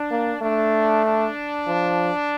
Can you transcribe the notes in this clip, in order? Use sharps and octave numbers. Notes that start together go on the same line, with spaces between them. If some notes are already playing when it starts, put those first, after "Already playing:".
Already playing: D4
A#3
A3 D4
D4
F3